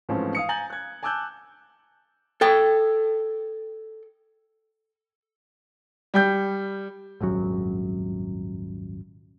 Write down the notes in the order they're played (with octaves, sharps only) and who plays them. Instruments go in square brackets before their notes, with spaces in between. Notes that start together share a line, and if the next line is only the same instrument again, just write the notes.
[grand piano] G#2 E3 F3 A3 C4 C#4
F5 D#6 C#7
G#5 A#5 G6 A6 F#7
F#6 G#6
G#5 A5 D6 E6 F#6 G6
[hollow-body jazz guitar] A4 G5
[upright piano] G3 G5 G6
[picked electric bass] D#1 G#1 F#2 F#3